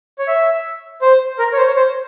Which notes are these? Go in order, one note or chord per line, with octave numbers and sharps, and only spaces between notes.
C#5
E5
C5
A#4
C#5
C5
C#5
C5